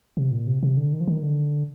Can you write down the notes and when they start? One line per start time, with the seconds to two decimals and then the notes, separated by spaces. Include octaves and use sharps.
0.17 C3
0.32 A#2
0.47 C3
0.63 C3
0.77 D3
0.93 D#3
1.00 F3
1.07 D#3
1.23 D3